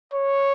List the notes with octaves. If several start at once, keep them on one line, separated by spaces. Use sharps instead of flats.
C#5